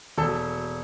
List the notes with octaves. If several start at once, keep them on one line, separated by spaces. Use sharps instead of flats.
E1 A4